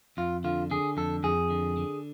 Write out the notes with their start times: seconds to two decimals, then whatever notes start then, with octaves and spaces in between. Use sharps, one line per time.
0.17 F2 F4
0.44 D3 F4
0.71 D3 G#4
0.97 F2 A4
1.23 F2 G#4
1.50 D3
1.77 D3